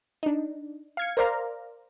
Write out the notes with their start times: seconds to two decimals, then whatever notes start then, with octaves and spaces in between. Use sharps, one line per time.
0.23 D4 D#4
0.97 F5 G#6 C#7
1.17 A#4 C5 D5 F5 A#5